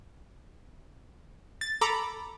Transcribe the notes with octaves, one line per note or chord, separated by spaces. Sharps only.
A6
A4 A#5 B5 D6